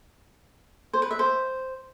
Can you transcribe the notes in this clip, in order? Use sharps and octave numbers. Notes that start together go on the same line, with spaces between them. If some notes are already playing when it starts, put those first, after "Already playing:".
C5
B4
E5
C5